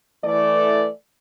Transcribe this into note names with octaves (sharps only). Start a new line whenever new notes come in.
E3 A3 D5